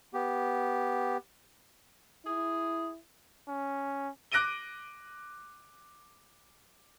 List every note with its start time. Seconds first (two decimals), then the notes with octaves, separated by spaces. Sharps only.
0.14 B3 G4
2.26 E4 G#4
3.48 C#4
4.32 D6 F#6 A#6 D7 D#7 G7